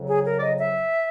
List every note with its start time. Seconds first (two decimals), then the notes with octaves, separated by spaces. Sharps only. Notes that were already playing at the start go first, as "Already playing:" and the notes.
Already playing: F2 C#3 F#3
0.09 G#4
0.26 A#4
0.38 D5
0.42 D#5
0.59 E5